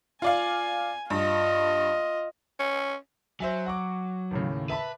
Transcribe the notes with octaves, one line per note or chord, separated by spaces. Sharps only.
F4 D5 F5 G#5
G2 F4 D#5
C#4
F#3 C5 E5 G#5
F#5 C#6 D6
D#2 A2 C#3
B4 E5 A5 B5